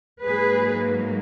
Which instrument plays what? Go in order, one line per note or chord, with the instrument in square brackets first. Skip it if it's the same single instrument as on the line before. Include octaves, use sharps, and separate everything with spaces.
[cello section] G#2 F#3 A#3 G#4 B4